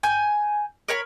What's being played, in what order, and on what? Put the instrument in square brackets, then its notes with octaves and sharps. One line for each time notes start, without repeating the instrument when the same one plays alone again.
[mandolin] G#5 G6
A#4 C#5 B5